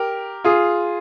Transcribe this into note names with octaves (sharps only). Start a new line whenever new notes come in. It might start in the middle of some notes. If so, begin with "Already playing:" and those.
Already playing: G4 A#4
F4 G#4